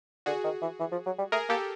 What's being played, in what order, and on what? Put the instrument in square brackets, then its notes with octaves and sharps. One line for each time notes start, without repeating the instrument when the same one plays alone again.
[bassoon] D3 [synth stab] F#4 G#4
[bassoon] D#3
E3
E3
F3
F#3
G3
[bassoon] A3 [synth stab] G#4 A#4
[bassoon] A#3 [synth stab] G4 A4